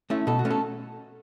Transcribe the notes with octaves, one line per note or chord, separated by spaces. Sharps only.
A3 C#4 E4
B2 A4
F#4
A3 C#4
A4